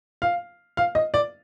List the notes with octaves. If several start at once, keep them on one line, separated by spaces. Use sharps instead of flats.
F5
F5
D#5
D5